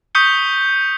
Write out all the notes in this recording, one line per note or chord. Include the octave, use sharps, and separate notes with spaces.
C#6 D#6 G6 B6 C#7 G7